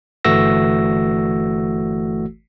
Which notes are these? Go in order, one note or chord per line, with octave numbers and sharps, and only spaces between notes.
G1 E3 A3 F#4 E6 A#6